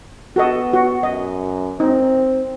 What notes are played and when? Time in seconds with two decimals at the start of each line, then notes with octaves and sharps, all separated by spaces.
0.36 B3 F#4 A4 D#5
0.73 F#4
1.03 F#2 D#5
1.80 C4 D#4